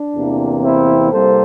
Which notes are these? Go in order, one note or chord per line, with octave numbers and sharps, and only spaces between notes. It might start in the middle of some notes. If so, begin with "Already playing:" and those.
Already playing: D4
E2 C3 E3 A#3
C4 E4
C2 C3 G3 A#3 A4 C5